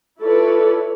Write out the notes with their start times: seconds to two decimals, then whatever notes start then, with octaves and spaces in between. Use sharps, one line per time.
0.21 E4 F4 A4 B4 C#5 D5